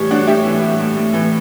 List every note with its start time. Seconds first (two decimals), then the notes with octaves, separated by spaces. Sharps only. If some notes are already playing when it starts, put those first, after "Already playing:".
Already playing: A2 E3 G3 C#5
0.10 A2 D4 F#4
0.27 A2 E4 G4
0.45 E3
0.63 G3
0.80 A2
0.96 A2
1.13 E3